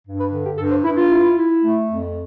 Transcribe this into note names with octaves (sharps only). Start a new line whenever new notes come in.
G2
B4
D3
G4
G2 A4
C5
G2 E4
F4
E4
E4
A3
F2